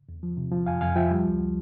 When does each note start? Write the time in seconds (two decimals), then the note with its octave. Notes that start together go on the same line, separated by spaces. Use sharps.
0.09 E2
0.23 F3
0.37 C3
0.52 F3
0.66 F2 F5 G#5
0.81 F2 F5 G#5
0.96 F3 E5 G5
1.11 G3
1.26 C#2